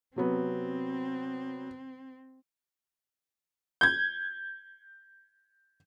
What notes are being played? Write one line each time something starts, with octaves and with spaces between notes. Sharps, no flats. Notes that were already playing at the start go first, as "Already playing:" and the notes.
C3 F#3 B3 C4
G6 G#6